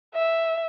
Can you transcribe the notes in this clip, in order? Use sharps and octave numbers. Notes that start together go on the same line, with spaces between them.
E5